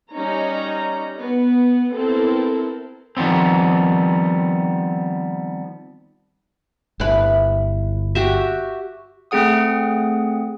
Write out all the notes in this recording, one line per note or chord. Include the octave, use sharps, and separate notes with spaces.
G3 C#4 D#4 C#5 A#5
B3
B3 C4 E4 A4 A#4
D#3 F3 G3 B3 C4
G1 E4 B4
F#4 G4 E5
A3 C4 G#4 F#5 D#6